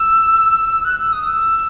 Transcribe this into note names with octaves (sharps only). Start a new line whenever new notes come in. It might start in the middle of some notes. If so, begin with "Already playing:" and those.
Already playing: E6
F#6
E6
D#6
E6